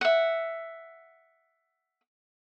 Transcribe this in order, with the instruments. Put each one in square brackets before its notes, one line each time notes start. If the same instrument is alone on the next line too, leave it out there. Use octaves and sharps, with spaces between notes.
[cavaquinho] E5 F#5